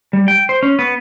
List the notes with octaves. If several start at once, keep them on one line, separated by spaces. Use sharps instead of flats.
G3
G5
C5
C#4
B3